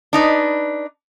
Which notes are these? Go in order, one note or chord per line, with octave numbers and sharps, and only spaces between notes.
D4 D#4 B4